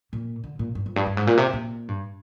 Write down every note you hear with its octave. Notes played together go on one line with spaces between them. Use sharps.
A#2
D3
A#2
G2
F2
G2
G2
G#2
A#2
C3
A#2
G2